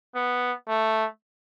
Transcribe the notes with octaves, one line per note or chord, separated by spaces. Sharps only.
B3
A3